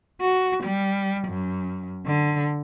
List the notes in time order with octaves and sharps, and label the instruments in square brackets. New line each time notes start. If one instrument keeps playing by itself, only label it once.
[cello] F#4
G3
F#2
D3